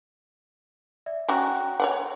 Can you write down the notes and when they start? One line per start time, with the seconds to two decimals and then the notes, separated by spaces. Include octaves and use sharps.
1.06 D5 E5
1.29 F#3 C#4 F#4 G5 A#5 F#6
1.80 C#5 D5 F#5